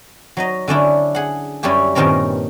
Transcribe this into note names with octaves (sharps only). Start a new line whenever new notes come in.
F#3 D#4 D#5
D3 C#4 D4 E4
G#4 F#5
F#2 G3 C#4 E4 G4 G#5
G2 A#2 D#3 C4 C#4 A#4